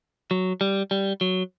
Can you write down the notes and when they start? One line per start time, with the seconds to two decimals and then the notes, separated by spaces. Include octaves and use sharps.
0.31 F#3
0.61 G3
0.91 G3
1.21 F#3